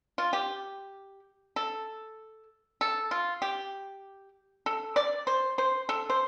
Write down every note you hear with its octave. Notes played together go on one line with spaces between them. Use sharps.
F4
G4
A4
A4
F4
G4
A4
D5
C5
C5
A4
C5